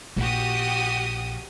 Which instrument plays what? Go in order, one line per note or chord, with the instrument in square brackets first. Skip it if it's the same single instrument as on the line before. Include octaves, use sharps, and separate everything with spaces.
[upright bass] A#1 [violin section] F#4 G4 D#6